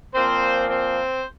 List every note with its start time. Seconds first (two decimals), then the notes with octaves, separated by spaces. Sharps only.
0.14 A#2 F3 A#3 C4 C5
0.68 C4 C5